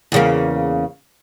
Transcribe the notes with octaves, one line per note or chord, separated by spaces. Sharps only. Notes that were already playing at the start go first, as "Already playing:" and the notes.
E2 C#3 A#3